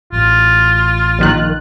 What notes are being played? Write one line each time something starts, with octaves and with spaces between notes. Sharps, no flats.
A1 F4
A#1 D#3 F#6